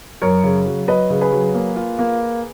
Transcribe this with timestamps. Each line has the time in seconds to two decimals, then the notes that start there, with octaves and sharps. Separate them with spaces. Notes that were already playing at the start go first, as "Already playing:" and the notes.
0.22 F#2 A#4 C#5
0.44 C#3
0.66 F#3
0.88 F#3 B4 D#5
1.10 C#3
1.21 G#4 B4
1.32 F#3
1.54 A#3
1.76 F4
1.99 A#3